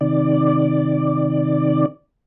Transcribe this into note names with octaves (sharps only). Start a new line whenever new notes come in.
C3 D#3 D5